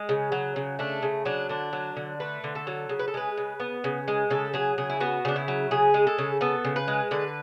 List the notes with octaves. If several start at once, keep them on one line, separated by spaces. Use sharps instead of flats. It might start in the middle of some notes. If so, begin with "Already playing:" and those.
Already playing: G#3
C#3
F#3
C#3
A3 D4
C#3
F#3 D4
D3 D4
F#3
D3
A3 B4
D3
A4
F#3
C#3
B4
A4
G#3 B4
C#3
B3
C#3
G#3
C#3 A4
F#3 G#4
C#3 G#4
E4
B3 F#4
C#3 D4
E4
F#3
C#3 G#4
G#3
A4
C#3
B3 A4
C#3
B4
G#3
D3 B4